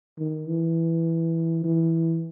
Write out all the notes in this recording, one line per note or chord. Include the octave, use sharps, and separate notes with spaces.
D#3
E3
E3